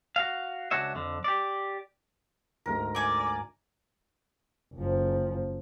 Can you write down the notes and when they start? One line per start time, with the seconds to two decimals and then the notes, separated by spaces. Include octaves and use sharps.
0.16 F#4 F5
0.71 C#2 D4 F#4 C#5 E5
0.95 F2 D3
1.24 G4 D5
2.66 D2 G#2 A3 A#4
2.95 D5 G#5 D6
4.74 F#1 F3